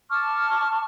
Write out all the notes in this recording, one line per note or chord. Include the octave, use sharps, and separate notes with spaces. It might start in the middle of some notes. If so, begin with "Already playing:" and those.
A5 C#6 D6 F6